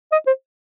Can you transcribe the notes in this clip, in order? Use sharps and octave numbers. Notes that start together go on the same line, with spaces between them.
D#5
C5